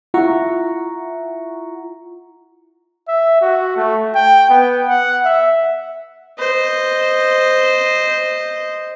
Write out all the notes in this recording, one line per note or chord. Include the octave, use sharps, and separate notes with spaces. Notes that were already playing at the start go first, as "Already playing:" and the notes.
E4 F4 E5 F#5 A#5 C#6
E5
F#4
A3
G5
B3
F#5
E5
C5 D#5